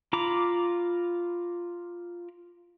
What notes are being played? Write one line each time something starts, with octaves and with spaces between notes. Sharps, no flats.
F4 A#5 B5 D6